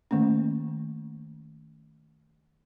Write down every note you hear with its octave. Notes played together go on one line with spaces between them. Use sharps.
D#3 A3 A#3 C#4